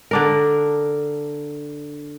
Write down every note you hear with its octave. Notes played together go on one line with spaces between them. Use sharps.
D3 D4 A#4